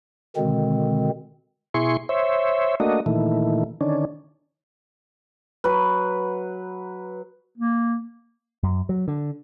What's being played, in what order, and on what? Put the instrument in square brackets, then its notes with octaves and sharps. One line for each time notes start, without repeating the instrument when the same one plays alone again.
[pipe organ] B2 D3 D#3 G#3 C4
[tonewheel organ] B2 E4 G#4 C6 C#6
C5 C#5 E5
A3 A#3 D4 F#4 D#5
A#2 D#3 E3 A3
D3 D#3 C#4 D4
[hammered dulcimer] F#3 B4
[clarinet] A#3
[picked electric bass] F#2
F#3
D3